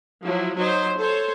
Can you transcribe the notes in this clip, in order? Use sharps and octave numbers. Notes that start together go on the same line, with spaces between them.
F3 F#3 E4
F#3 D#4 C5
A4 C5 C#5